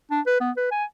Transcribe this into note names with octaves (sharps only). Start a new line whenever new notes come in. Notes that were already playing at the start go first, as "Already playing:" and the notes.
D4
B4
B3
B4
G#5